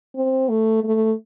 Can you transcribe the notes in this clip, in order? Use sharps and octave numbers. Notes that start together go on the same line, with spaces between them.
C4
A3
A3